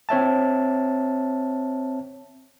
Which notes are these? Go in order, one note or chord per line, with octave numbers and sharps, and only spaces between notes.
C4 C#5 E5 A5